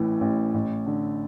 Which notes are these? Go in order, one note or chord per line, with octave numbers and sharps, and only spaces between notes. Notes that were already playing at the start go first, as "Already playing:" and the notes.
Already playing: A1 A2 E3
A1
A1
D3